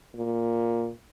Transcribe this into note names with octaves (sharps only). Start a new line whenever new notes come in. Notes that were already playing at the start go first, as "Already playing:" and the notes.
A#2